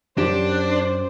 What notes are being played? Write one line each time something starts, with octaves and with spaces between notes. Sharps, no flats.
F#2 D4 G4 C5